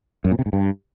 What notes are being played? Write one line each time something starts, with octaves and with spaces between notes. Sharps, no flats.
F#2
A#2
C3
G#2
G2